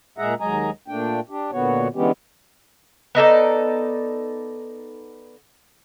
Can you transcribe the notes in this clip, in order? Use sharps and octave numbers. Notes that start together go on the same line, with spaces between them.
A#2 G#3 G#4 E5 F#5 A#5
D#2 F#3 G#3 D#5 G#5 A#5
A#2 A3 D4 G5
D4 G4
A#2 D3 B3 F#4 C#5
D3 E3 G#3 B3 C#4 G4
B3 D#4 A4 D5